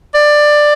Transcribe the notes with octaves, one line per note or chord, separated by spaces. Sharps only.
D5